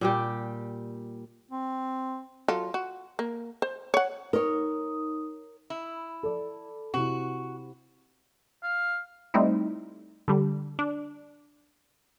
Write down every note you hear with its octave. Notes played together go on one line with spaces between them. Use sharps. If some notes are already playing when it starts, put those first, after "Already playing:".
A#2 G3 G4
C4
F#3 F4 A4
F#4
A#3
C5
C#5 F#5
D#4 A#4 C#5 D#6
E4
A4 D5
C3 E4 F#4
F5
G3 A3 C4 D#4 E4
D3 G3
D4